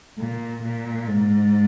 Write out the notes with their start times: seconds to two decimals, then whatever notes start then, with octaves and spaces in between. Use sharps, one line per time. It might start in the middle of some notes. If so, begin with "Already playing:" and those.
0.18 A#2
0.63 A#2
1.08 G#2